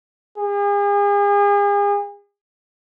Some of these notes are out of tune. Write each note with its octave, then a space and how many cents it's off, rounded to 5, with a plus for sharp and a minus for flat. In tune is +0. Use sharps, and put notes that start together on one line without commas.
G#4 -40